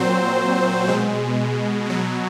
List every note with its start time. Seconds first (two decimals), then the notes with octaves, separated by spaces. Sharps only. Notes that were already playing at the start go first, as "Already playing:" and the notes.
Already playing: A#2 F#3 C4 C5
0.88 B2 G#3
1.86 B2 F#3